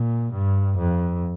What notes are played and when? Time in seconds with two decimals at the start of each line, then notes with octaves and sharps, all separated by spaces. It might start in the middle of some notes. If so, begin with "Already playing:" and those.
Already playing: A#2
0.33 G2
0.78 F2